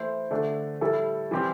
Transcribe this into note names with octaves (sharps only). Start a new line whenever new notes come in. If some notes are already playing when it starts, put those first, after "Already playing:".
Already playing: E3 A3 E4 C5
D3 A3 D4 A4
A2 G3 E4 A4
E3 G3 C4 G4 C5